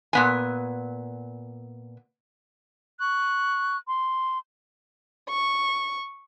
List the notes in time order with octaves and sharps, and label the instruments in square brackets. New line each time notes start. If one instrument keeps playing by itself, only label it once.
[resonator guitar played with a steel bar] A#2 B3 G#5
[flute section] C#6 F#6
C6
[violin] C#6